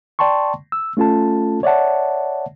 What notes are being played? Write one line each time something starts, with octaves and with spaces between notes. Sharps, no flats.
D5 G5 A5 C6 C#6
E6
A3 C#4 F4 A4 A5
C#5 D5 E5 F#5 A5